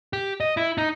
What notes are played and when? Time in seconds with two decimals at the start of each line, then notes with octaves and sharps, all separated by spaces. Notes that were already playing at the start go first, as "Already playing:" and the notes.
0.13 G4
0.40 D#5
0.57 E4
0.78 D#4